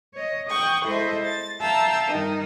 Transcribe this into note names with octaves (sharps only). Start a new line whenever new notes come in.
C#5 D#5
F#5 G5 C#6 D#6
G#3 E4 A4 C5 D#5 E5
A6
E5 F5 G5 A5 A#5 E6
G2 D#3 D#4